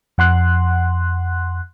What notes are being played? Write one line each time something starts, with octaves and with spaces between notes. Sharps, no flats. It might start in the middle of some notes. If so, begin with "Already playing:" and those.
F2 F#5 C6 F#6